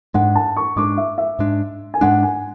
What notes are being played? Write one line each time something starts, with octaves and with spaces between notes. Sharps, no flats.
G#2 G#3 D4 F#5
A5
C#6
G#2 G#3 D4 D6
E5
E5
G#2 G#3 D4
G#5
G#2 G#3 D4 F#5
G#5